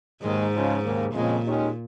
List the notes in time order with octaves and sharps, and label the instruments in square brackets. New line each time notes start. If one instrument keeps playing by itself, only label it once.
[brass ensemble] D#2 D#3 G#3 [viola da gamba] G#2
[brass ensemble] C#2 C#3 F3 G#3 C#4
D#2 C#3 A#3
[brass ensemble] F2 C#3 G#3 [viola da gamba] A#2
[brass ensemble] D#2 D#3 G#3 C#4